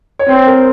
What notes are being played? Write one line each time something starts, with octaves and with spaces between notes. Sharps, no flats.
C#5
C4 C5
A#4